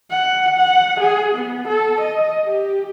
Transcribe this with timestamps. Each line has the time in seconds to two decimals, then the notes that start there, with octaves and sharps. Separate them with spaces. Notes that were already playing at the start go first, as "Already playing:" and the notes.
0.11 F#5
0.57 F#5
1.01 G#4
1.36 B3
1.68 A4
2.01 D#5
2.46 G4